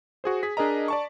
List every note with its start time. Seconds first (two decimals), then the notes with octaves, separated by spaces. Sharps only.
0.24 F#4 G#4 C5
0.43 G#4 B6
0.57 D4 G#4 A#4 D#5 A#5
0.88 D5 A5 C#6